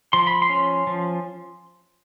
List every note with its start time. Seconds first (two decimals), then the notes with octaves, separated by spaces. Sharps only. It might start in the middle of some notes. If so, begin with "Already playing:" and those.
0.13 F3 C6
0.27 B5
0.42 C6
0.50 C#4
0.87 F3